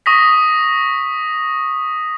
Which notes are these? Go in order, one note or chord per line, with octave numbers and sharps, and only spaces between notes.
C#6 D#6 A#6 B6